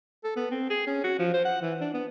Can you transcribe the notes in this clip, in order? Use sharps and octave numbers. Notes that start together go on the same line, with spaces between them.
A4
B3
C4
G#4
C#4
F#4
F3
C5
F#5
E3
D4
B3